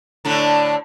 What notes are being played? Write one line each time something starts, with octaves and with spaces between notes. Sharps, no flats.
A2 D3 A3